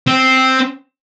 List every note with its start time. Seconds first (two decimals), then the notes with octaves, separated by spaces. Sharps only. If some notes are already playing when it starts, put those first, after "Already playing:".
0.07 C4